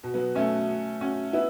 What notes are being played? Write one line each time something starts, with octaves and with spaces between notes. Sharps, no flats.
B2
F#3 B3
A3 C#4
C#4 F#4
B3 E4